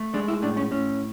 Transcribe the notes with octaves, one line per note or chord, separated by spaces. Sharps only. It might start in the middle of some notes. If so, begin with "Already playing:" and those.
Already playing: A3
G#3 D4
E4
A2 D4
C#4
A2 C#4